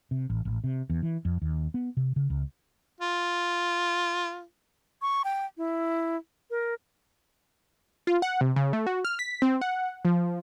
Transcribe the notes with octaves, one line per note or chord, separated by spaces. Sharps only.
C3
A1
A1
C3
E2
E3
F2
D#2
B3
C3
C#3
C#2
F4
C#6
G5
E4
A#4
F4
F#5
C3
C#3
A3
F#4
F6
B6
C4
F#5
F3